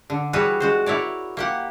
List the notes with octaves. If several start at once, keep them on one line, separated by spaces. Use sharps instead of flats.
D3
E3 G3 F#4 G#4 B4 C#5
G#3 F#4 C5
E4 A#4 C#5 D5
A#3 G4 F#5